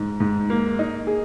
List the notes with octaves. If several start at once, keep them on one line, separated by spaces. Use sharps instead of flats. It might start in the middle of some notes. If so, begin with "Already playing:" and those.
Already playing: G#2
G#2
A#3
D#4
G#4